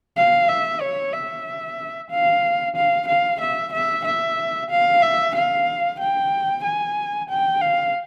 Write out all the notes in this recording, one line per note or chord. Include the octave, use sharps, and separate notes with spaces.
F5
E5
C#5
E5
F5
F5
F5
E5
E5
E5
F5
E5
F5
G5
G#5
G5
F5